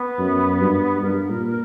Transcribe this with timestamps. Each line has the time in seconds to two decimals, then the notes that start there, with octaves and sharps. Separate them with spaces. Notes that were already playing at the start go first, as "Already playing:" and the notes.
Already playing: B3
0.19 F#2
0.61 G2
1.02 G2 A#4
1.30 A#2